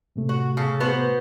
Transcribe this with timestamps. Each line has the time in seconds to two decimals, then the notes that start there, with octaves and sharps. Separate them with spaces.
0.16 A2 C3 A3
0.29 F#4
0.57 C#3 A4
0.80 B3 F#4 C5